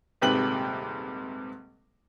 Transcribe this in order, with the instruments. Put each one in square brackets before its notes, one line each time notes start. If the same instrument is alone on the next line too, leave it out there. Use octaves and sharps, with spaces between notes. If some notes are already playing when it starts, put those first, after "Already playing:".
[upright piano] D#1 G#2 C3 B4 G5 F#7